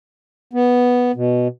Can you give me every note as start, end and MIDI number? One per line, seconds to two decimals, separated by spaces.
0.53 1.12 59
1.15 1.48 47